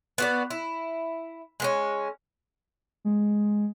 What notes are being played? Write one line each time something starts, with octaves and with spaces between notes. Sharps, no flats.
B3 F#4 D5
E4
G#3 B3 C#4
G#3